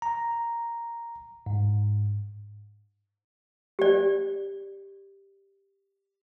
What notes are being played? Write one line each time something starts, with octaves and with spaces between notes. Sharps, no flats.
A#5
G#2
G4 D5